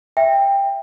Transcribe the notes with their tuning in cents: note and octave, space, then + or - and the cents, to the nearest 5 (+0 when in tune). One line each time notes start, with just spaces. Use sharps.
E5 +0 G5 +15